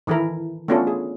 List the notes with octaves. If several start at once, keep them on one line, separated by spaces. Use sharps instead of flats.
D#3 E3 E4 A4 A#4
A3 B3 C#4 D4 F4 A4
G#4